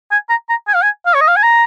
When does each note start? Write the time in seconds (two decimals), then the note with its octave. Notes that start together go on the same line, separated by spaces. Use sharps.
0.11 G#5
0.29 A#5
0.49 A#5
0.68 G#5
0.75 F5
0.82 G#5
1.06 F5
1.14 C#5
1.21 D#5
1.28 F5
1.36 G#5
1.43 A#5